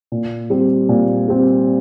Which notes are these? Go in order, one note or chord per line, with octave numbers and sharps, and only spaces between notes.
A#2
G3 C4
A#2
G3 C4